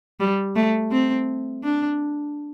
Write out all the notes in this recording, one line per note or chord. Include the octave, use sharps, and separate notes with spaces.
G3
A3
C4
D4